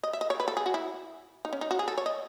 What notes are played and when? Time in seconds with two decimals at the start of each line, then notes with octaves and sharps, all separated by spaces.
0.03 D#5
0.13 E5
0.21 D#5
0.30 C#5
0.40 B4
0.48 A4
0.57 G#4
0.66 F#4
0.74 E4
1.45 D#4
1.53 C#4
1.61 D#4
1.71 F#4
1.79 G#4
1.88 A4
1.98 C#5
2.06 D#5